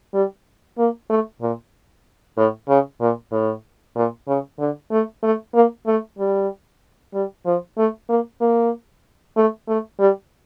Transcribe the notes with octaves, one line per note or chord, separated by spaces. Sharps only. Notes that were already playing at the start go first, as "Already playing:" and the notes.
G3
A#3
A3
A#2
A2
C#3
A#2
A2
A#2
C#3
D3
A3
A3
A#3
A3
G3
G3
F3
A3
A#3
A#3
A3
A3
G3